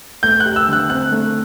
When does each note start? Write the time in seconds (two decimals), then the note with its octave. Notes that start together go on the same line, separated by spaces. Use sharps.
0.23 A3 G6
0.40 F#6
0.46 G4
0.56 E6
0.68 D3 F#6
0.89 C4 F#6
1.12 A3